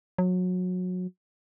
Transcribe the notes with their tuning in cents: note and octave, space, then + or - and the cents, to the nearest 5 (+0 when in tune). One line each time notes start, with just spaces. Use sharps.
F#3 -25